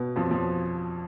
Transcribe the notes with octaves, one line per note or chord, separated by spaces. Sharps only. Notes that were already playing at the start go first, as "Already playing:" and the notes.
Already playing: B2 B3
F2 F3
F2 F3